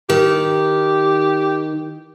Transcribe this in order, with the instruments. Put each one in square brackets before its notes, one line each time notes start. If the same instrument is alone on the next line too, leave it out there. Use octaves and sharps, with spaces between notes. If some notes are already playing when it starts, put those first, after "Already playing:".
[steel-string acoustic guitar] D#3 [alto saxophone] G4